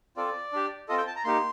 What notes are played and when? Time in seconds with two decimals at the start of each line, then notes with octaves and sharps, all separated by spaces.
0.17 C4 F4 A4 D5
0.53 D4 G4
0.88 C4 F4 A4 D#5
0.98 G5
1.07 A5
1.16 A#5
1.24 A#3 D#4 G4 C6